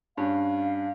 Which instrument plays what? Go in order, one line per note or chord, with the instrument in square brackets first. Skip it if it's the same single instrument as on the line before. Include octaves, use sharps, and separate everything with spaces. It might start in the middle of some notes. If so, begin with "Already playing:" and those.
[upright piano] G2 C#4 [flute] F5